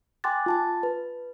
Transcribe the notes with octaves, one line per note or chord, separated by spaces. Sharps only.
G5 G#5 C6 D6 F#6 A6
F4 A5 A6
B4